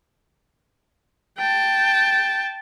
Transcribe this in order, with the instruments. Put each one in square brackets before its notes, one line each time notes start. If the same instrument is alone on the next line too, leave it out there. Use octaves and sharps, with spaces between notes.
[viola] G5 A5